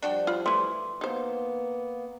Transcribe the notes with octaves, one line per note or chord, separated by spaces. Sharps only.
F3 G3 D4 F#4 G5
F4 B5
E3 A3 E4 C6
A#3 B3 D#4 C5